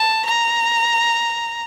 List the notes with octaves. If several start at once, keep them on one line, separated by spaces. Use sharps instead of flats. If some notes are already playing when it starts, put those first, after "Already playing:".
Already playing: A5
A#5